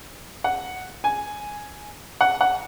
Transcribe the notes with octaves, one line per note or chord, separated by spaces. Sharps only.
F#5
G#5
F#5
F#5